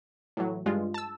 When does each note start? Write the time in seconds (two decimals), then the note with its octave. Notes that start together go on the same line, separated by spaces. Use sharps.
0.37 A2 E3 F#3
0.66 G2 G#3 F4
0.94 A5 E6